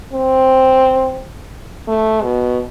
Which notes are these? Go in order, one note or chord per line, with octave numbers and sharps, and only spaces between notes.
C4
A3
B2